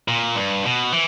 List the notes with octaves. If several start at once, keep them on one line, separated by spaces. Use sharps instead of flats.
A#2
G2
B2
E3